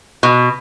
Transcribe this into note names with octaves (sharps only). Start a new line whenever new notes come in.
B2